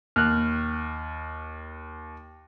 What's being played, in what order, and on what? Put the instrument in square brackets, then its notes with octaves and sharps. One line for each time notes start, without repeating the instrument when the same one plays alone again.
[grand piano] D#2 [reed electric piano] F6 F#6